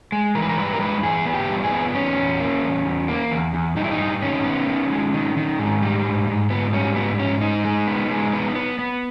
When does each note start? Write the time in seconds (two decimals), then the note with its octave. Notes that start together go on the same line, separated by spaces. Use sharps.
0.12 G#3
0.35 E3 A#4
0.42 B4
0.49 A#4
0.58 G2 B4
0.73 A#4
0.80 G#3 B4
1.03 E3 G#4
1.26 B3
1.33 G4
1.49 G2
1.64 G#4
1.71 B3
1.94 E2 C#4
2.17 E2
2.39 A#3
2.63 E2
2.86 E2
3.08 A#3
3.32 E2
3.54 E2
3.76 G2 D#4
3.84 E4
3.91 D#4
4.00 G2
4.22 D#3 C#4
4.45 B3
4.68 D#3
4.91 G#3
5.14 D#3
5.37 D#3
5.59 G#2
5.82 G3
6.05 G#2
6.28 G#2
6.50 G#2 B3
6.73 G3 C#4
6.96 G#2 B3
7.19 G#2 C#4
7.41 G#3 D#4
7.65 G#3
7.87 B3
8.11 G#3
8.33 B3
8.55 B3
8.79 B3